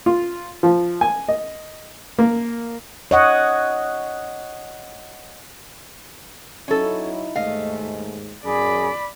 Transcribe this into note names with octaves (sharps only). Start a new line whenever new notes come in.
F4
F3
G#5
D#5
A#3
C#5 D#5 F#5
F#3 C#4 D#4 E4 A4
D#2 G#2 G#3 A3 D#5 F5
F#2 G#4 D5 B5